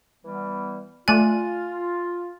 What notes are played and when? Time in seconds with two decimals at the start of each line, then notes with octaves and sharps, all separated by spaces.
0.23 E3 G3 B3
1.08 A3 F4 D5 G#5 F#6